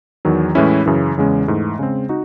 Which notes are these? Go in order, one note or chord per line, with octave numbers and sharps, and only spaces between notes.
E2 D#3 F#3
A2 E3 G#3 C#4 E4
F#2 C#3 E3
E2 C#3 G#3 C#4
G#2 E3 A3
C#3 G#3 C4
D#4 F#4